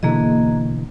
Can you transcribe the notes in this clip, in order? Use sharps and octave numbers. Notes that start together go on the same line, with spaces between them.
B2 D3 E3 A#3 G#4 D#5